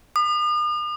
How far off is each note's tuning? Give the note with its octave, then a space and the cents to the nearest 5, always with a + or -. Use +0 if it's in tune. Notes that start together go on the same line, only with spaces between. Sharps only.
D#6 -45